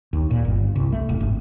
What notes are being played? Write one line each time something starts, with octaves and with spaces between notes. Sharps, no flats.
D#2
A#2
G1
C2
A3
E1
G#1